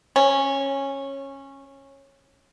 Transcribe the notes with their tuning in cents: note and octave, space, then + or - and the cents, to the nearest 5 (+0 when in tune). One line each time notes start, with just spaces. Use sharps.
C#4 -15